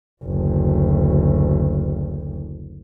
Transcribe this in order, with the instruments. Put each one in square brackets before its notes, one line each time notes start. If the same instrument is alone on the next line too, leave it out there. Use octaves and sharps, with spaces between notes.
[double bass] F#1 D2